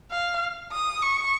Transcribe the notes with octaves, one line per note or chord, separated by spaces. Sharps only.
F5
D#6
C#6